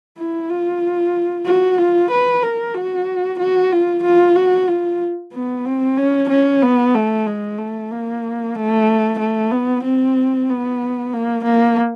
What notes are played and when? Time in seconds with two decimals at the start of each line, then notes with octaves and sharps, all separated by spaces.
0.18 E4
0.49 F4
1.45 F#4
1.78 F4
2.11 B4
2.43 A#4
2.74 F#4
3.39 F#4
3.72 F4
4.04 F4
4.36 F#4
4.68 F4
5.33 B3
5.66 C4
5.97 C#4
6.29 C#4
6.62 B3
6.94 A3
7.27 G#3
7.58 A3
7.91 A#3
8.55 A3
9.19 A3
9.51 B3
9.84 C4
10.49 B3
11.13 A#3
11.45 A#3